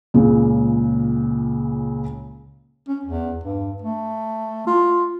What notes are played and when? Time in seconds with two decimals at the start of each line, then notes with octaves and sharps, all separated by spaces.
0.14 C#2 A#2 C#3
2.88 C#4
3.05 E2
3.44 G2
3.82 A3
4.67 F4